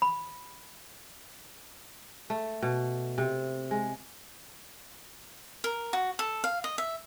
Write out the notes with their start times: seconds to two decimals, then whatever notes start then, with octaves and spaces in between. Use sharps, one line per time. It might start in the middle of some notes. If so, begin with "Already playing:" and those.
0.02 B5
2.30 A3
2.63 B2
3.18 C3
3.71 G#3
5.64 A#4
5.93 F#4
6.19 A4
6.44 F5
6.64 D#5
6.78 E5